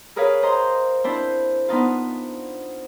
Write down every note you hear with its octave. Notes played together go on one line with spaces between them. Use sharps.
G#4 A#4 B4 C#5 F5
C5 D#5 A#5 C6
C4 D4 E4 C5
B3 D4 D#4 F4